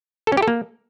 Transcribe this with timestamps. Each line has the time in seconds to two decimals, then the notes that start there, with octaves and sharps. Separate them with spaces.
0.27 A4
0.32 C#4
0.37 G4
0.42 A4
0.48 A#3